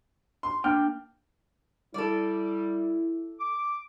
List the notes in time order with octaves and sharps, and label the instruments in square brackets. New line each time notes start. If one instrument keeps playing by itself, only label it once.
[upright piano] C6
[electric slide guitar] A#3 D4 G5 [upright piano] F6
[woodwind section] G3 [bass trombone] E4 [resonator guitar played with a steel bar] A4 D5
[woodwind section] D6